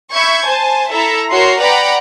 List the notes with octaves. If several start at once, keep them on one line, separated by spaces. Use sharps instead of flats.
E5 B5 C#6 G6 G#6
C5 G#5 A5
E4 A4 E5 A#5
F#4 A#4 C#5 C6 C7
B4 D5 F#5 G5 A#5 B5